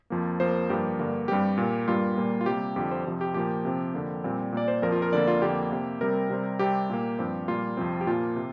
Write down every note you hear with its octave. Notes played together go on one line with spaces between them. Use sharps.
F2 F3 A#3
F2 F3 A#3 C5
G2 F3 A#3 G4
G2 D3 A#3
G2 G3 C4 G4
A#2 A#3
G2 G3 A#3 F4
A#2 G3 A#3
F4
C3 G3 A#3 G4
F2 D3 F3 G4
C5
F2 C3 F3
G4
A#2 F3 A#3 G4
C3 F3 C4
F2 D3 A#3
A#2 G3 C4
A#2 A#3 D5
C5
F2 F3 A#3 A#4
F4
A#4
F2 D3 A#3 D5
F4
F2 D3 A#3 G4
C3 A#3
C3 G3 C4 A#4
C3 G3 C4
C3 G3 C4 G4
A#2 A#3
G2 F3 C4
A#2 G3 A#3 F4
F2 C3 F3 C4
G4
A#2 F3 A#3 F4
C3